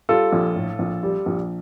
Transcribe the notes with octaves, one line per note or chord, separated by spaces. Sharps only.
G3 F4 A4
A#1
A2
A#1
G3
A#1